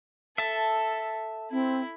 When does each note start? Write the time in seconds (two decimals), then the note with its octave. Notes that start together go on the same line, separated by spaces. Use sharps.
0.38 A4 E5 A5
1.52 C4 E4